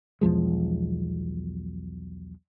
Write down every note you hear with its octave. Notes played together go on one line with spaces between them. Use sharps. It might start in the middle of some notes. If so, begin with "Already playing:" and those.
B1 E2 F3 G#3